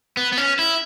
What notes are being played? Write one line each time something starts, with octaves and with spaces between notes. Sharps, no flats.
B3
B3
C#4
E4